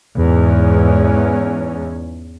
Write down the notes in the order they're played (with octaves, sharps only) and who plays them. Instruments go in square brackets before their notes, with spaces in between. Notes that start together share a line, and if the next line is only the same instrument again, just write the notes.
[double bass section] E2 G#2 C#4